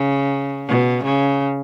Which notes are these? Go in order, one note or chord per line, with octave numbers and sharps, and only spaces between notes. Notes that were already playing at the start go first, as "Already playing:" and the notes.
Already playing: C#3
B2
C#3